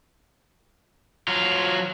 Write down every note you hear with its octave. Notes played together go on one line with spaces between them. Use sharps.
F#3 F4